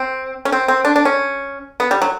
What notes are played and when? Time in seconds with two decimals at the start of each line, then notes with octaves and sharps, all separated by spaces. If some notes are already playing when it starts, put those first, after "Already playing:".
Already playing: C4
0.45 C#4
0.52 C4
0.68 C4
0.85 D4
0.96 D4
1.05 C#4
1.80 B3
1.91 G3
2.02 F#3